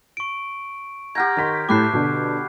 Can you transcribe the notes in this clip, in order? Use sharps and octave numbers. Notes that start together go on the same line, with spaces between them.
C#6 D7
G4 F#5 A#5 F6 G6 G#6
D#3 D#4 C#5 C6 B6
A2 A3 G4 B4 A5 D6 F#6 C7
B2 D3 D4